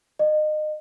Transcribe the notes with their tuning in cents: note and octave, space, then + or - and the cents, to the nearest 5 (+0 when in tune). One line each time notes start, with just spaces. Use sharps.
D#5 -30